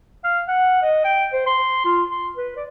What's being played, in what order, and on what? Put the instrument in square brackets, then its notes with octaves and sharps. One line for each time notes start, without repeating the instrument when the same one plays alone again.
[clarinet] F5
F#5
D#5
G5
C5
C6
F4
C6
B4
D5